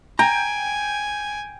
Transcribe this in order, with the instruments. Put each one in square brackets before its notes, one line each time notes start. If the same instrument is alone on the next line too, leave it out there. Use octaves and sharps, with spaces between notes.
[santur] G5 [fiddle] G#5 [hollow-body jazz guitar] A#5